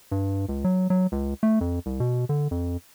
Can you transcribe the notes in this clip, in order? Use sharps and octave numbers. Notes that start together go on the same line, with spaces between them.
G2
C#2
F#3
F#3
C#2
A3
F2
C2
B2
D3
F2